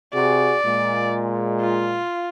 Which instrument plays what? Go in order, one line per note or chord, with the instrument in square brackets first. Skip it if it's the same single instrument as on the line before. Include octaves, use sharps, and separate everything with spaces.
[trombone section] C3 F#4 G#4 [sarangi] D5
[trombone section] A#2 G#3
[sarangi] F4